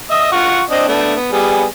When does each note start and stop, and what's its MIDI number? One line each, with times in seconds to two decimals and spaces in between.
0.11 0.30 75
0.11 0.30 76
0.11 0.30 87
0.32 0.61 65
0.32 0.61 78
0.32 0.61 85
0.70 0.84 60
0.70 0.84 62
0.70 0.84 75
0.88 1.14 57
0.88 1.14 59
0.88 1.14 62
1.15 1.30 59
1.32 1.65 55
1.32 1.65 59
1.32 1.65 68